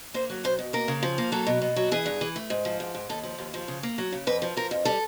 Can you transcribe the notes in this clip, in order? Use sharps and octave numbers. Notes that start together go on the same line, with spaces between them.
A#3 C5
F#3
B2 C5
B2
A#3 A#4
C#3
F3
A#3
F#3 A4
B2
B2
F#3
E3 G#4
G2
E3
A3
G#2
F3
G#2
G#2
D#2 A4
F3
D#2
F3
C#3
A#3
F#3
C#3
F2 B4
F3
F3 A#4
F2
G3 A4